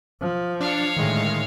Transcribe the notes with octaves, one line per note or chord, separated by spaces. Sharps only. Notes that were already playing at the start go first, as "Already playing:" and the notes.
F3
D4 C#5 F5
A2 D3 D#3 G#3